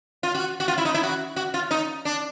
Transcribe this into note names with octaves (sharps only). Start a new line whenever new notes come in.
F4
F#4
F#4
F4
E4
D#4
E4
F#4
F#4
F4
D#4
D4